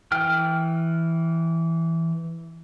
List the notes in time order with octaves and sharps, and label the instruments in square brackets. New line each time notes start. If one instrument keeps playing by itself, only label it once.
[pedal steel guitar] E3 G5 F6